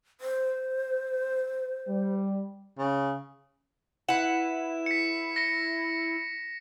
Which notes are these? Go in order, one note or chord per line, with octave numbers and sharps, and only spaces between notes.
C5
G3
C#3
E4 B4 F#5 E7
B6 C#7
A#6 C#7